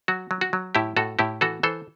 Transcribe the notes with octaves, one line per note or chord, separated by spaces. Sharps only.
F#3 F#4
F#3
F#4
F#3
A2 E4 G4
A2 F#4 A4
A2 E4 G4
E3 F#4 A4
E3 A4 C5